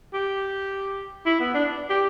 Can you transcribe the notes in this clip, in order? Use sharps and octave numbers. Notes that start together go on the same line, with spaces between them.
G4
E4
B3
D4
G4